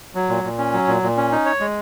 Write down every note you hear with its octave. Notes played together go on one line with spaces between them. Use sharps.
F#3
A#2
A#2
C#4
F#3
A#2
A#2
C#4
D#4
C#5
G#3